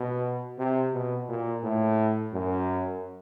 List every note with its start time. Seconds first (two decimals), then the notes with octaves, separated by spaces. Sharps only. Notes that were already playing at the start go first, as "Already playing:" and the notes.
Already playing: B2
0.58 C3
0.94 B2
1.29 A#2
1.63 A2
2.33 F#2